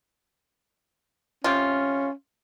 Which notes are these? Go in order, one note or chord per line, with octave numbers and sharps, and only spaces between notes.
C3 C#4 F4